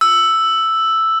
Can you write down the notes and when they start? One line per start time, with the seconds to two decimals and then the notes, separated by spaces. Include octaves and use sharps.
0.01 E6